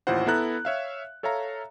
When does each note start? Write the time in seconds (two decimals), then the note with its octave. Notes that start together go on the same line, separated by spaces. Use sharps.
0.07 A1 D#2 E4 F4 C5 F#5
0.27 B3 E4 A4 A#5 F#6
0.65 C#5 E5 F5
1.23 A4 C#5 E5 F5 A#5